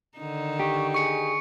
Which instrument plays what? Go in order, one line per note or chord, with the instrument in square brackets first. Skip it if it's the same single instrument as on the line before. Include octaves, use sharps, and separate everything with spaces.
[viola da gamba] D3 D#3 D#4
[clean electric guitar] G4 [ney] C#6
[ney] G#4 [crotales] C#6 C#7